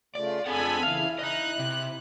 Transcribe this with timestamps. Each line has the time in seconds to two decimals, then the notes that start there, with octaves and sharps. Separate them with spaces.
0.15 C#3 A3 F4 D5
0.46 F2 C4 D4 G#4 A4 F#5 G#5 B5
0.83 C#3 E3 E4 F5
1.19 D#5 A#5 F#6
1.59 C3